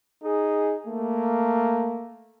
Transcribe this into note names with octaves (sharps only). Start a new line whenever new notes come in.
D#4 G#4
A3 A#3